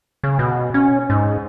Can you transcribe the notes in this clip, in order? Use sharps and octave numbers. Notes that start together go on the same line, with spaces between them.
C#3
B2
C#4
G#2